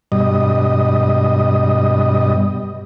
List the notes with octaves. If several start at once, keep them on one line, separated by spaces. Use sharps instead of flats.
G2 B2 G3 D#5